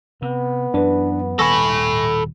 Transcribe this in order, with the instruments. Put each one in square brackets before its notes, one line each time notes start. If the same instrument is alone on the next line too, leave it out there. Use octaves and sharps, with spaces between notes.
[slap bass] C3 [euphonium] B3
[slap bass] F#2 E3 [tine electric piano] D4 B4
[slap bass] D#1 D#3 G3 [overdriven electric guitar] A4 B5 [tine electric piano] G#5 C#6 A#6